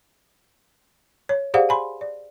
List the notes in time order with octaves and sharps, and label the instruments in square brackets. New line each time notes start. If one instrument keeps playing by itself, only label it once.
[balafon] C#5
G4 G#4 C5 D5 F5 F#5
G#5 B5 C6
D5